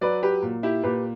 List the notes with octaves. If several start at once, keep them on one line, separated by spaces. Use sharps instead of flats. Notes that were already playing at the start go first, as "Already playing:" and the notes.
F#3 B4 D5
G4 B4
A#2
E4 G4
A#2 G4 B4